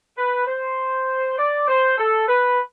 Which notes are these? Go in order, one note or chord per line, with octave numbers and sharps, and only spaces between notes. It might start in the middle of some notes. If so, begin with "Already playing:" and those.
B4
C5
D5
C5
A4
B4